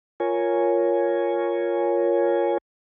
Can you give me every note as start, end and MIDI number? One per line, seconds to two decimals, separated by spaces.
0.20 2.58 65
0.20 2.58 70
0.20 2.58 73
0.20 2.58 80